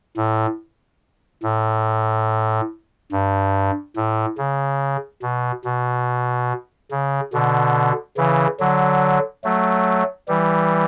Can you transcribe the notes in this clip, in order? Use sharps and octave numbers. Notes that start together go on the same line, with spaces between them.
A2
A2
G2
A2
C#3
B2
B2
C#3
B2 D3
C#3 E3
D3 F#3
F#3 A3
E3 G3